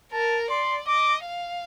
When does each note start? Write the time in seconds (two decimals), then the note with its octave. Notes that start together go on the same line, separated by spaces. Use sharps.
0.13 A#4 A5
0.50 D5 C6
0.88 D#5 D6
1.26 F5